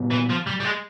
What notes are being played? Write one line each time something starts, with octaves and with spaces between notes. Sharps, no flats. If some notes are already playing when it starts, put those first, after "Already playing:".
Already playing: A#2 G3 B3
E3
F3
G3
G3
G#3